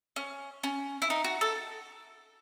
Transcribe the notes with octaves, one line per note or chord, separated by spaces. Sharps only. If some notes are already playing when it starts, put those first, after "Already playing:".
C#4
C#4
E4
D#4
F#4
A4